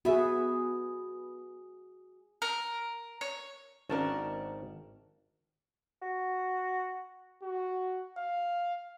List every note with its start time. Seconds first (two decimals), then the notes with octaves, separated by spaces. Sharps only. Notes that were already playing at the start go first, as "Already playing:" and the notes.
0.05 B3 F#4 G#4 E5
2.42 A#4
3.21 C#5
3.89 G#1 C#4 D4 A#4 A5
6.02 F#4
7.43 F#4
8.18 F5